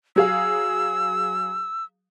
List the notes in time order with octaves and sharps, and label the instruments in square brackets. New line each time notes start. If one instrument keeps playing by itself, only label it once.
[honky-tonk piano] F#3 G#4 F5 [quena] E6